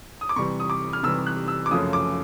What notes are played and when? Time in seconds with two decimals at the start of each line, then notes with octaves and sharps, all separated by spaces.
0.21 D#6
0.29 D6
0.36 C3 E3 G3 C#6
0.60 D#6
0.70 D6
0.93 F6
1.03 C3 E3 G3 E6
1.27 F#6
1.48 E6
1.66 D6
1.71 F#2 C#3 F3 A3 C#4 D#6
1.93 D6